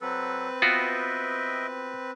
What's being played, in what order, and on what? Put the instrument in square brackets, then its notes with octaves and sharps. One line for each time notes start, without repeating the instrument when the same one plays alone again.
[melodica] F#3 A4 [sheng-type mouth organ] C4 B4
[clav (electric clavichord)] B3 F4 F#4 [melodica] D#5 E5 G5